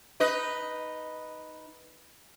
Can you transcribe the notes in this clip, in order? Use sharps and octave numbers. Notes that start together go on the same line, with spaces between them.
D#4 B4 D#5